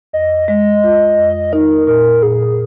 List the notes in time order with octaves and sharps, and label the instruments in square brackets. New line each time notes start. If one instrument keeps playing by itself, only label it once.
[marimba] F2 [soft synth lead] D#5
[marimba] G#3 [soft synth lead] D#5
[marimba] F4
F2
[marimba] D#4 [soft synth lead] A#4
[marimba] A#2 [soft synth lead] A#4
[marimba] A#2 [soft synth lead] G#4